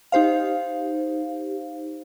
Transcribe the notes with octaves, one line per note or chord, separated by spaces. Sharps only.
D#4 G4 C5 F5